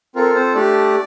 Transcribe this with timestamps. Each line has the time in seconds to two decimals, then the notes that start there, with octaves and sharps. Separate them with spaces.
0.15 C4 F4 A4 A#4
0.35 C4 C5
0.55 A3 D4 G4 D5